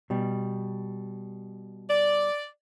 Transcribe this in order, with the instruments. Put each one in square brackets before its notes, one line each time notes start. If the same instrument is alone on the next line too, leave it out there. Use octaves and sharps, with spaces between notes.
[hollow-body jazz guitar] B2 G3
[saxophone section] D5